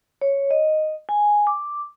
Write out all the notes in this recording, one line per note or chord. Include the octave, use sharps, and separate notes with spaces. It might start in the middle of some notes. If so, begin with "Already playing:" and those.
C#5
D#5
G#5
D6